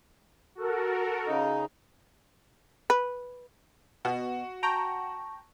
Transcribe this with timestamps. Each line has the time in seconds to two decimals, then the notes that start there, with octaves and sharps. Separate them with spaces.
0.55 F#4 A4 A#4
1.27 C#3 D#4
2.90 B4
4.05 B2 F#4
4.63 G5 A5 A#5 C#6